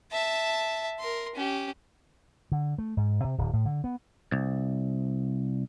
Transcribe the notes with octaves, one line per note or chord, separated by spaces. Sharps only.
E5 A5
A#4 C6
C#4 G4
D3
A3
G#2
C3
D1
A2
D3
B3
C2